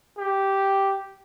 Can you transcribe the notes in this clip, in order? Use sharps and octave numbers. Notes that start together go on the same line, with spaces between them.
G4